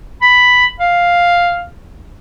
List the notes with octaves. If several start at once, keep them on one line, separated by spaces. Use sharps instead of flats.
B5
F5